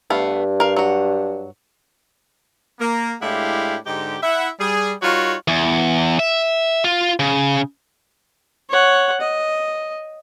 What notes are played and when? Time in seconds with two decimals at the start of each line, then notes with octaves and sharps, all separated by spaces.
0.10 G2 A3 B3 F5
0.60 A#4 F5
0.76 F#3 F#4
2.80 A#3
3.21 A2 G#3 D4 E4 G4 F5
3.87 G#2 D3 D#4 G4
4.23 E4 E5 F#5
4.60 G3 G#4
5.03 G3 D#4 F4 F#4 A#4 C#5
5.48 E2
6.19 E5
6.84 F4
7.20 C#3
8.70 C#5 F#5
9.21 D#5